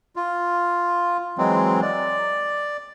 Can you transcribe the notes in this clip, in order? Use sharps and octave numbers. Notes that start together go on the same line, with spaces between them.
F4
E3 F#3 G#3 C4
D5